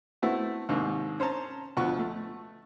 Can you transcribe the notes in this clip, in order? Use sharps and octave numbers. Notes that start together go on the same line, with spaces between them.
A3 B3 C4 E4 F#4
D#2 G#2 C3
C#4 C5 C#5 A5 A#5
D2 B2 F3 F#5 C#6
A3